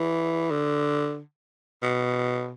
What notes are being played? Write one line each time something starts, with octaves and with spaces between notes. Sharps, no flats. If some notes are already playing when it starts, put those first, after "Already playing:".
Already playing: E3
D3
B2